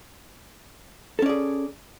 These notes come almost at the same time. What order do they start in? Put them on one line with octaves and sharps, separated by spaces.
A4 C#4 D5 G#4